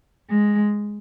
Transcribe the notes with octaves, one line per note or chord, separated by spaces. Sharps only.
G#3